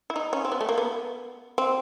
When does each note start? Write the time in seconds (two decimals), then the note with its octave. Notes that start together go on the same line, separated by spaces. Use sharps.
0.10 E4
0.16 D#4
0.33 C#4
0.45 C4
0.52 B3
0.61 A3
0.69 A#3
0.78 B3
1.58 C4